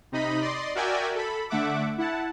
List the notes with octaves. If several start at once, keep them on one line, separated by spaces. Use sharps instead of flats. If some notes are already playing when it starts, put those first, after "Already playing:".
C3 D#4 D#5 B5
D5 D#5 C6
F#4 A#4 D5 E5 G5 G#5
A4 B5
D3 A3 E5 F#5 D6
E4 F#5 A5